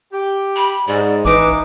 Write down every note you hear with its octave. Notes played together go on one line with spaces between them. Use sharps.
G4
B5
G#2 D5
A1 E3 D#4 B4 D6